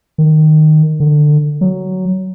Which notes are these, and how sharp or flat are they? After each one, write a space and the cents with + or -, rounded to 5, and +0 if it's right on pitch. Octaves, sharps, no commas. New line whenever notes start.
D#3 -10
D3 +20
F#3 +10